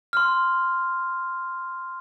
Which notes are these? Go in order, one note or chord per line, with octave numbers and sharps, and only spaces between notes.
C6 F6